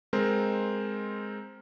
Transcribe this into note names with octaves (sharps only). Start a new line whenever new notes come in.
G#3 C4 A#4 C5